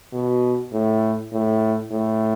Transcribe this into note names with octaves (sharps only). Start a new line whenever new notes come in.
B2
A2
A2
A2